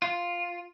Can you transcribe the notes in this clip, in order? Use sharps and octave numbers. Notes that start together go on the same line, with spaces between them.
F4